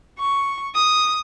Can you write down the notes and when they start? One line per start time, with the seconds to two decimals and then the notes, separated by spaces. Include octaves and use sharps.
0.19 C#6
0.75 D#6